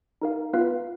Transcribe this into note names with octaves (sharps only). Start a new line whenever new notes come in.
D#4 A#4 F5
B3 F4 B4 F5